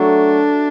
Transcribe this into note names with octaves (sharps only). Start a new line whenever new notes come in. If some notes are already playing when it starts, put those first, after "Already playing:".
Already playing: F#3 A3 D4